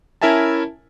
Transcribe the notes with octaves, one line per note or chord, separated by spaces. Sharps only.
C#4 E4 A#4 E5 G#5 A5